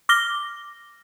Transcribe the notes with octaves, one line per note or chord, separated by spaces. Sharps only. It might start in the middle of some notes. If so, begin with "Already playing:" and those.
D6 F6 A#6 G7